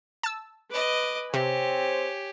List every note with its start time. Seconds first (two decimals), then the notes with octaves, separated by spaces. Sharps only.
0.23 A5 E6
0.71 B4 D#5 D6
1.34 C3 C4 G4 C#5 G#5